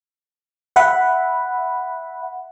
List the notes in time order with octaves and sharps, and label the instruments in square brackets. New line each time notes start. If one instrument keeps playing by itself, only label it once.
[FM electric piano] E5 F#5 B5